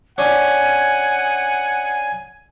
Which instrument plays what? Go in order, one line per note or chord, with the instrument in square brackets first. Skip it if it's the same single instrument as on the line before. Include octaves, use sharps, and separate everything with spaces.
[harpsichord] C#4 D4 [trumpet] F#5 [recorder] G#5